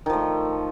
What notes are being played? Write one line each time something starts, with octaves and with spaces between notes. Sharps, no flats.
D#3 F3 A3